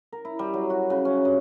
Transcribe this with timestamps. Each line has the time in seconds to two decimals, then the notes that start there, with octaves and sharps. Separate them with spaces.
0.12 A#4
0.25 E4
0.39 G3
0.54 F#3
0.70 F#4
0.90 C#3
1.05 C#4
1.25 G2